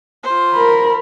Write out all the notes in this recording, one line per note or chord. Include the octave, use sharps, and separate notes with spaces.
F4 C5
A#4 B5